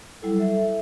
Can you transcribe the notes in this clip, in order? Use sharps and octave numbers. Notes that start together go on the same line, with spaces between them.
F#3 G3 E4 A4
A4 E5